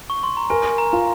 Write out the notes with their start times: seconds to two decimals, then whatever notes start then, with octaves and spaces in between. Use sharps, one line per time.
0.10 C#6
0.23 C6
0.37 A#5
0.50 A#4 G#5
0.78 A#5
0.93 F4